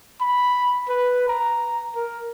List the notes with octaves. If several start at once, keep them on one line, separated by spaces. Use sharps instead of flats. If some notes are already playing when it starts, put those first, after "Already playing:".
B5
B4
A#5
A#4